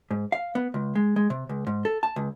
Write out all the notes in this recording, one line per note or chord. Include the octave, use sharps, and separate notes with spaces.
G#2
F5
B3
C#2
G#3
G#3
C3
C#2
G#2
A4
A5
C#2